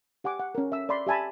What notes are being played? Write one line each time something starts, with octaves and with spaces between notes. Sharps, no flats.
G4 F#5 G#5 D6
F#5
C#4 A#4
E5 E6
D5 E5 B5 C6
G4 E5 G#5 A5 B5